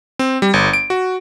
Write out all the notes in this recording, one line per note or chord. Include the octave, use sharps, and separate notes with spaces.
C4
G3
G1
D7
F#4